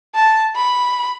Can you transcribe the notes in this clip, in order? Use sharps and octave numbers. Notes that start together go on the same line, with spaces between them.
A5
B5